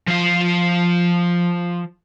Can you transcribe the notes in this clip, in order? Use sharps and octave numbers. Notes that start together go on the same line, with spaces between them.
F3 F5